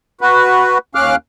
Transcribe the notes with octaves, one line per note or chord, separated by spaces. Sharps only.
F#4 B4
D#2 C#4 F5 D6 F6 F#6